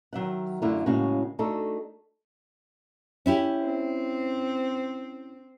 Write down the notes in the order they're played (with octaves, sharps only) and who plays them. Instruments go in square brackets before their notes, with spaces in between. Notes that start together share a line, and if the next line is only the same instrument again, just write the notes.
[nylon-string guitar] D#3 F#3 E5 F#5
F#2 D3 A3 E4 F4 A#4
A2 C#3 G#3 A#3 C#4 F#4
A3 D4 D#4 F#4 A4
C#4 E4 G4
[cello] C4